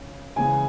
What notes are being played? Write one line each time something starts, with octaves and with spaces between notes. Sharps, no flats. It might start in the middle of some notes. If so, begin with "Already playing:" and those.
Already playing: C#3
C#3 E3 G#3 G#5